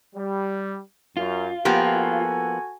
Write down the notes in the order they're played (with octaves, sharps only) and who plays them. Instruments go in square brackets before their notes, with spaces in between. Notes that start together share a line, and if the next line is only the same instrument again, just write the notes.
[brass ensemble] G3
[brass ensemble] F#2 [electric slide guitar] F4
[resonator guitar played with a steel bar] F3 A#3 B3 [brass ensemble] F#4 A4 G#5 [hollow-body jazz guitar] G4